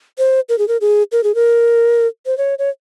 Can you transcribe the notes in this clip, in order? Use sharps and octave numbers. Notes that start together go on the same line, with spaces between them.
C5
A#4
G#4
A#4
G#4
A#4
G#4
A#4
C5
C#5
C#5